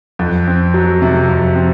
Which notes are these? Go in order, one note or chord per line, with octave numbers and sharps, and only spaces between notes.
F2
C4
F#3
C3
F2
C4